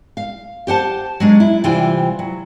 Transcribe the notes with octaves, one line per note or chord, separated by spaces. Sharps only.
F5
G4 C5 F#5 A5
F#3 G#3 D4
E4
C3 E3 G3 F4 C5 G5
F#3